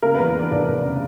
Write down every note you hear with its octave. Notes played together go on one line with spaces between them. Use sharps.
C#3 A#3 A#4
E2 B3 B4
E2 D4 D5
F1 D4 D5
F1
C#3